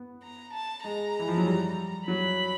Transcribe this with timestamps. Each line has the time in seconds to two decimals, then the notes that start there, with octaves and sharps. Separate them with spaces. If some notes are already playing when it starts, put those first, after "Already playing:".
Already playing: B3
0.23 A#5
0.54 A5
0.84 G#3 A#5
1.19 E3
1.28 F3
1.37 F#3
1.46 G3
2.08 F#3 B5